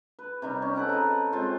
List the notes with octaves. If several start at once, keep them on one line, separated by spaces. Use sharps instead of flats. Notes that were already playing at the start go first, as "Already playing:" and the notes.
B4
C3 D#3 G3
C#4
A4 B4 F#5 G5
D#4 B4
G#3 C4 F4